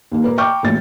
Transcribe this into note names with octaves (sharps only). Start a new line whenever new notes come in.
D#2 A#3
A#2 A#3 B4
G5 A#5 C#6 D6 F6 G6
E1 A1 A#2 A6